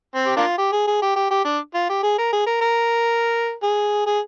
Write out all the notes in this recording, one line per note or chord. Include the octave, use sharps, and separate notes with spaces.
C4
G4
A#3 D4 F4
G4
G#4
G#4
G4
G4
G4
D4
F4
G4
G#4
A#4
G#4
A#4
A#4
G#4
G#4